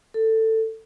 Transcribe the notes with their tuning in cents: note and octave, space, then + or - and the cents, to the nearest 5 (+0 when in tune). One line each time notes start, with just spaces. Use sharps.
A4 +15